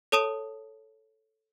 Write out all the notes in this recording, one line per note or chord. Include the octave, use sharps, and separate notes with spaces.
A4 C#5 A5 D#6 D7 E7